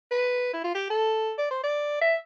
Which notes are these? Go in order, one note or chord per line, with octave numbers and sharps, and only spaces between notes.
B4
E4
F4
G4
A4
D5
C5
D5
E5